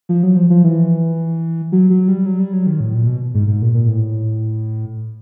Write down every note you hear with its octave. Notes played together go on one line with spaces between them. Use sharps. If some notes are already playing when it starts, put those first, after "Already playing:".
F3
F#3
F3
F3
E3
F#3
F#3
G3
F#3
G3
F#3
D#3
A2
A#2
B2
G#2
G#2
A#2
A#2
A2